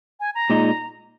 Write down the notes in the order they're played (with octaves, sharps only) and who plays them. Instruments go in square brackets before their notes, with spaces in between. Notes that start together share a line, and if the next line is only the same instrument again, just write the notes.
[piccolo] G#5
A#5
[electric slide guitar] A#2 G#3 D#4